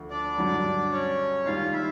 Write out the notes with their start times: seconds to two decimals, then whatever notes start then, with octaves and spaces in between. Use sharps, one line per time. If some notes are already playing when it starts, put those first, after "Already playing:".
Already playing: D2 D3 F3
0.11 D4 D5
0.38 G2 D3 F#3
0.92 C#4 C#5
1.45 D#2 D#3 G3 F4 F5
1.72 E4 E5